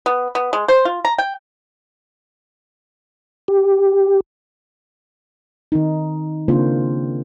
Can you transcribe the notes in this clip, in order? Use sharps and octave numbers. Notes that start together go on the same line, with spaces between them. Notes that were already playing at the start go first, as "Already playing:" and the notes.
B3
B3
G#3
C5
F4
A#5
G5
G4
D#3 C4 D#4
C#3 A#3 C4 D4 F4 C5